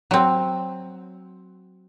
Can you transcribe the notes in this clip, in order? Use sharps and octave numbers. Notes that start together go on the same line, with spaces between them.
F#3 C4